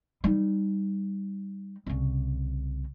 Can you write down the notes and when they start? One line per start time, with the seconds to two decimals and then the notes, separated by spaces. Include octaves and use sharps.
0.24 G3 D#4
1.86 C2 C#3